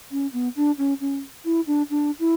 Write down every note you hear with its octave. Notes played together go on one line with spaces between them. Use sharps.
C#4
B3
D4
C#4
C#4
E4
D4
D4
E4